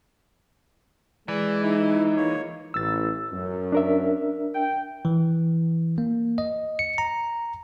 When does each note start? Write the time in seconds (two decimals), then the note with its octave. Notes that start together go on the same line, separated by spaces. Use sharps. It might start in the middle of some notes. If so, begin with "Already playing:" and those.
1.28 E3 G#3 D5
1.63 D#4 E4
2.17 A#3 C#5
2.74 A1 E6 A6
3.32 F#2
3.72 D4 A#4 E5
4.54 G5
5.05 E3
5.98 A#3
6.38 D#5
6.79 C#7
6.98 A#5